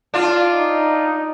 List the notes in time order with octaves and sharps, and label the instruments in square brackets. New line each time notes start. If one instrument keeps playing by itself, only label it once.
[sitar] D4 F4
[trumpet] D#4